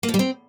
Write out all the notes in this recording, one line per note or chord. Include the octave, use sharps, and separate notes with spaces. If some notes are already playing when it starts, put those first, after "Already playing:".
A#3
F3
G3
C4